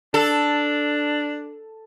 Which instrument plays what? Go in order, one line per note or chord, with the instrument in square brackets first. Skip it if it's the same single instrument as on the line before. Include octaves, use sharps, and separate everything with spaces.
[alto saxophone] D4 [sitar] A4